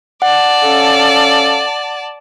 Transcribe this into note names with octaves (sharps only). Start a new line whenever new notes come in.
D5 F#5 A5
C#4 A4 F5